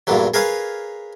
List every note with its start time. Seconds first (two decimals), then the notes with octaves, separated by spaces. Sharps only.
0.07 E2 G2 A#2 D3 F#3
0.34 G#4 A#4 B4 C#5 F5 G#5